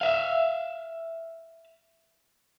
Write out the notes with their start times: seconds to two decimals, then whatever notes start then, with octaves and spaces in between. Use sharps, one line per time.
0.01 E5 F5